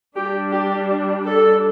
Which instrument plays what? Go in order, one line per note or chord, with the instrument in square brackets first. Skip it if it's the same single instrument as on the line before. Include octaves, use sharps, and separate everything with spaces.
[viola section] G3 D4 G4
G4
A4